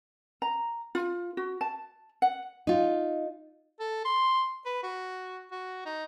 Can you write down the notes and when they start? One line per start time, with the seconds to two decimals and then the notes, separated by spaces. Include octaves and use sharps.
0.42 A#5
0.95 F4
1.37 F#4
1.61 A5
2.22 F#5
2.67 D#4 F4
3.80 A4
4.05 C6
4.65 B4
4.83 F#4
5.51 F#4
5.86 D#4